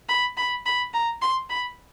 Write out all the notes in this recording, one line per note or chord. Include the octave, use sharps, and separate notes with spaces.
B5
B5
B5
A#5
C6
B5